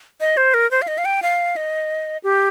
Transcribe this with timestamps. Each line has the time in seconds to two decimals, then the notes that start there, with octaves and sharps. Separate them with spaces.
0.21 D#5
0.37 C5
0.54 A#4
0.71 C5
0.82 F5
0.88 D#5
0.98 F5
1.05 G5
1.22 F5
1.56 D#5
2.24 G4